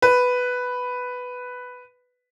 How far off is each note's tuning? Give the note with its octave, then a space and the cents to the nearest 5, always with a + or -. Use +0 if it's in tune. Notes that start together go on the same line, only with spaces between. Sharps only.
B4 +5